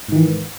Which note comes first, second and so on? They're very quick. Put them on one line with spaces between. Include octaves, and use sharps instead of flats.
G#2 D#3 E3